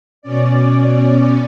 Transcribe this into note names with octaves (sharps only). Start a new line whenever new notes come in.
B2 C#4 D5